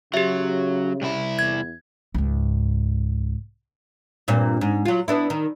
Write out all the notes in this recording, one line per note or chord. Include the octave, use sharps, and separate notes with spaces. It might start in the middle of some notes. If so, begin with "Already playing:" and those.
C#3 F#3 G4 E5
C2 E4
E2 G#6
C#2 G#2
G2 A#2 C4
G#2
F#3 F4
B3 D4 E4
D#3